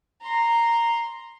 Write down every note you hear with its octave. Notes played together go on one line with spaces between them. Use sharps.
A#5 C6